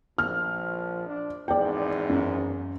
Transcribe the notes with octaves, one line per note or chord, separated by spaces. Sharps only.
A#1 F3 F6
D4
G#1 E2 G#2 D5 G5
F#2